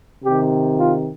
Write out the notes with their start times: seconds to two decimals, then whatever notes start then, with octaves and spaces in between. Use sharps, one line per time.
0.23 C3 D#3 G4
0.76 F4